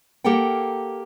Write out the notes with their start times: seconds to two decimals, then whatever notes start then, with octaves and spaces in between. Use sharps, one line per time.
0.24 A#3 G4 A4 A#4 F#5 G5